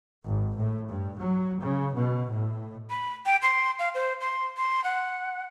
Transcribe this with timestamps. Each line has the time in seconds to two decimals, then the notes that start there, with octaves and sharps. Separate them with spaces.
0.24 G#1
0.57 A2
0.89 G2
1.19 F#3
1.60 C#3
1.95 B2
2.31 A2
2.90 B5
3.26 G5
3.42 C6
3.79 F5
3.95 C5
4.21 C6
4.57 C6
4.84 F#5